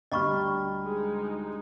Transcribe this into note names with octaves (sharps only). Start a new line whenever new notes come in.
D2 G3 D#5 G5 A#5 B5 C#6 F6
G#3 D#4